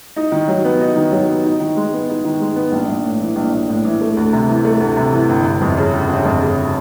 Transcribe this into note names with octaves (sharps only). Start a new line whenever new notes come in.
D#4
D#3
F#3
B3
D#4
D#3
F#3
B3
D#4
D#3
G#3
B3
D#4
D#3
G#3
B3
A#1
A#1
A2
E3
A#1
A#1
A2
E3
A3
D2
C3
E3
A3
D2
C3
E3
G1
G1
F2
C#3
G1
G1
F2
C#3